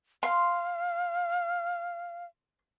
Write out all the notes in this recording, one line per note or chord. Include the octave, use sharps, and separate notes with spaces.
F5 C6